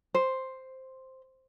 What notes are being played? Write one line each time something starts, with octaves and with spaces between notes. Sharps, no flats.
C5